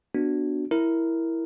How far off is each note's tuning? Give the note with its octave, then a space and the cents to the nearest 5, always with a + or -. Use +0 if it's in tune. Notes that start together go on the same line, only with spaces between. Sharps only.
B3 +0 D4 +10 F#4 +0
E4 +0 A#4 +0